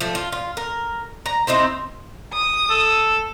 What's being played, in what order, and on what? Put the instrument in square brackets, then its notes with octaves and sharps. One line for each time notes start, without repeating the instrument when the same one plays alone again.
[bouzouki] F3 A3
F4
F4
A#4
A#5
C4 D#4 E4 C5
[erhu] D#6
[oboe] A4